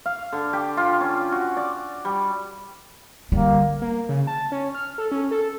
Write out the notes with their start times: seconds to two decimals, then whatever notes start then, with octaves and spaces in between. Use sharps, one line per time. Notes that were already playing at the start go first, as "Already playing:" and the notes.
0.06 F5
0.33 D3
0.53 G4
0.77 F4
1.01 C#4
1.32 F#4
1.57 D5
2.05 G3
3.32 D3 G3 A#3
3.82 A#3
4.09 C#3
4.27 A5
4.52 C#4
4.74 F6
4.98 A4
5.11 C#4
5.31 A4